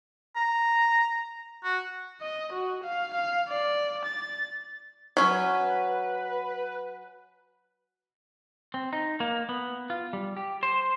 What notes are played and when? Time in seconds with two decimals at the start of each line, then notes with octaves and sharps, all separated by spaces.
0.36 A#5
1.64 F#4
2.21 D#5
2.53 F#4
2.84 F5
3.14 F5
3.49 D5
4.06 A6
5.17 F#3 C#4 B4
8.74 C4
8.93 D#4
9.20 A#3
9.49 B3
9.90 F4
10.13 G3
10.37 G4
10.63 C5